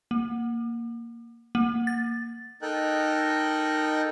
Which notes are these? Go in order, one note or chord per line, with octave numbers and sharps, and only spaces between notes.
A#3
A#3
A6
D#4 A4 A#4 D#5 G5 F#6